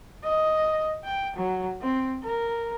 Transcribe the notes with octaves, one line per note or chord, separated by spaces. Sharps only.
D#5
G5
F#3
C4
A#4